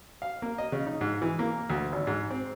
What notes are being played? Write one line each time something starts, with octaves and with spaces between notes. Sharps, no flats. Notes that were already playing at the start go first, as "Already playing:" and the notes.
F5
A#3
D#5
C#3
D#4
G#2
E3
A#3
D2
G#1
G#2
C4